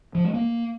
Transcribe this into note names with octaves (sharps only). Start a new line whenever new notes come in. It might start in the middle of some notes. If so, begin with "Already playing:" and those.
F3
G#3
A#3